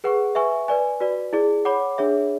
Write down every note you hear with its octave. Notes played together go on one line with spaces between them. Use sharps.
G#4 B4 F#5 C#6
B4 E5 G#5 C#6
B4 D5 G#5
F#4 B4 D5
E4 G#4 D5
C#5 F#5 B5 D6
D4 G#4 C#5 E5